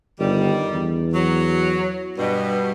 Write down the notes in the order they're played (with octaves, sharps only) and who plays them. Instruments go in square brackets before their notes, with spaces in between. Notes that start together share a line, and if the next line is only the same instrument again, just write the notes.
[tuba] G1 [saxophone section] D#3 G3
[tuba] E2
[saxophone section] F#3
G2 B2